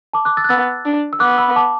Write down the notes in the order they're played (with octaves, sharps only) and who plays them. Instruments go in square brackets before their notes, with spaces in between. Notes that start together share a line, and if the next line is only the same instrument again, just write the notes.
[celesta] A5 D6
D6 F#6
E6 A6
F#6
[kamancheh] B3 [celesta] E6 A6
[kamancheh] D4
[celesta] E6
[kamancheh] B3 [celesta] D6 F#6
[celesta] D6
B5 E6
A5 D6